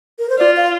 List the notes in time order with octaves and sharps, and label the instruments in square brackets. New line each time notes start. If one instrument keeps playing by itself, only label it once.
[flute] A#4
C5
[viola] F4 [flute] D5
[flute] F5